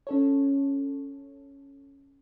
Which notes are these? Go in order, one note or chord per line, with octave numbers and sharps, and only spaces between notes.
C#4 A4 C#5